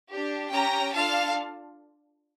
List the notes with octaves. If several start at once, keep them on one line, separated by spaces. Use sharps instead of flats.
D4 G4
C#4 G4 G5 A#5
D4 F4 A4 F5 A5